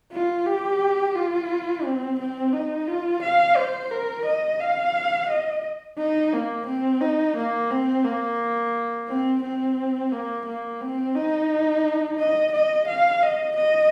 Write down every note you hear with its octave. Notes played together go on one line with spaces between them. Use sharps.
F4
G4
F4
C4
C4
D#4
F4
F5
C5
A#4
D#5
F5
D#5
D#4
A#3
C4
D#4
A#3
C4
A#3
C4
C4
A#3
A#3
C4
D#4
D#5
D#5
F5
D#5
D#5